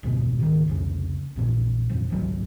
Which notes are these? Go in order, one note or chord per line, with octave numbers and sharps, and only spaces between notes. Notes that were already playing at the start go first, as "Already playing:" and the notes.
F1 D2 G#2 B2
G#1 C#2 D3 D#3
C2 F2 C#3
A#1 E2 A#2
D#1 F2 A#2
G#1 C#2 E3 F#3